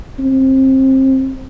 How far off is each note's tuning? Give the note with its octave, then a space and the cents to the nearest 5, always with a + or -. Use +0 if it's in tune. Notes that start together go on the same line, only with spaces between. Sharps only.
C4 +25